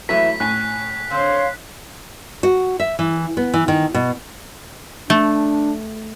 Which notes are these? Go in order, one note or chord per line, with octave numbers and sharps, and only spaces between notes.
E2 F#3 A3 E4 B4 B6
A2 C#4 G#5 F#6 B6
D3 C4 C#5 F5 C6
F#4
E5
E3
B3
E3
D#3
B2
A3 D4